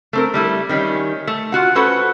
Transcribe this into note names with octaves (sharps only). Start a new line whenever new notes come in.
A3 C4 A#4
G3 A3 E4
D#3 G3 C#4
A3
F4 F#4 F#5
C#4 F#4 A4 B4 C5 F#5